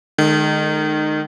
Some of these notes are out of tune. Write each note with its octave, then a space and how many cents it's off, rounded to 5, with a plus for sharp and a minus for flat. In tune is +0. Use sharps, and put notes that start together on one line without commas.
D#3 -25 G#3 +35